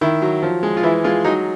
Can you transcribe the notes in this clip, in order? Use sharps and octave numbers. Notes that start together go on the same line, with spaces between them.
D#3 E4
F#3
F3
G#3
F4
E3 E4
G#3 F4
F#3 D#4